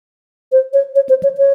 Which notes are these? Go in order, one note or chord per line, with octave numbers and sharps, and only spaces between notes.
C5
C#5
C#5
C5
C#5
C#5